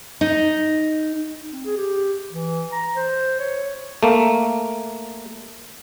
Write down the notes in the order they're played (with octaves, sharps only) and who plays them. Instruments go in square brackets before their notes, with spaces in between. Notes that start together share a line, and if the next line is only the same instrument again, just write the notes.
[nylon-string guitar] D#4
[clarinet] C4
G#4
G4
E3
A#5
C5
C#5
[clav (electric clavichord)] A3 A#3